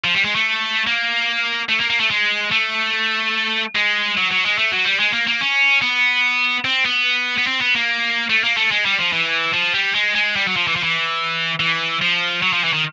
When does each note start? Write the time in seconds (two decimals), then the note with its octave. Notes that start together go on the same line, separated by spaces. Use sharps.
0.04 F3
0.15 G3
0.25 G#3
0.35 A3
0.87 A#3
1.69 A3
1.80 A#3
1.90 A#3
2.00 A3
2.10 G#3
2.52 A3
3.76 G#3
4.17 F#3
4.31 F#3
4.45 G#3
4.58 A3
4.72 F#3
4.85 G3
4.99 G#3
5.13 A#3
5.27 A#3
5.41 C#4
5.82 B3
6.65 C4
6.85 B3
7.38 B3
7.47 C4
7.61 B3
7.75 A#3
8.29 A3
8.44 A#3
8.57 A3
8.71 G#3
8.85 G3
8.98 F3
9.13 E3
9.54 F3
9.74 G3
9.95 G#3
10.15 G#3
10.36 G3
10.46 F#3
10.56 F3
10.67 E3
10.76 F3
10.83 E3
11.60 E3
12.01 F3
12.42 F#3
12.53 F3
12.64 E3
12.73 D#3